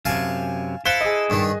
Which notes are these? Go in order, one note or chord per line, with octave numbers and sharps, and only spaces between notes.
F#2 C3 F5 G#5 A5
E4 A4 C5 F5 F#6 G7
G#4 D#5
G2 D#3